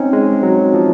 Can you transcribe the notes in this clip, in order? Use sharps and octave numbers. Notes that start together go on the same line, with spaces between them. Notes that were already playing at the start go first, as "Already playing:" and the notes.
Already playing: C4 C#4 D#4
G#3
F#3
F3